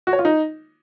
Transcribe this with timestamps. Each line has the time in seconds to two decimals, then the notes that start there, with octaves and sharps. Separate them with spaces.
0.07 F#4
0.13 C#5
0.19 F4
0.25 D#4